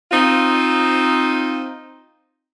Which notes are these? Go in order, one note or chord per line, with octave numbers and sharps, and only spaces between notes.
C4 D#4 F4